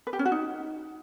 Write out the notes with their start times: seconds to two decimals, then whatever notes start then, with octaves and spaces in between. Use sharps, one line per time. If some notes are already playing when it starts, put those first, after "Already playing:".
0.07 B4
0.13 G4
0.19 C#4
0.25 F#4
0.32 D#4